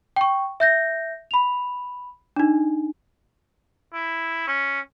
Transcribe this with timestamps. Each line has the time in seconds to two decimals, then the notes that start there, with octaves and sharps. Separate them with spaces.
0.16 G5 C#6
0.60 E5 G6 A#6
1.31 B5 F7
2.36 D4 D#4
3.94 E4
4.48 C#4